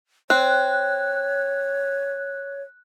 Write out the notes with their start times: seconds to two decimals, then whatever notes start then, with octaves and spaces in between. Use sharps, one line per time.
0.30 C4 C#5 F#6